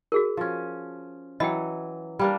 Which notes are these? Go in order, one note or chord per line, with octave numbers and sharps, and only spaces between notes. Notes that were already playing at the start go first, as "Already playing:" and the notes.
F#4 G#4 A#4
F3 C#4
E3 F#3 D#5 G5
G3 A#3 D4